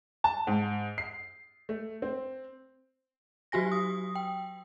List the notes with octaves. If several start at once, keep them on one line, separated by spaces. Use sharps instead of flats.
A5
G#2
C7
A3
C4
F#3 F#4 G4 G#5 A#6
D#6
G5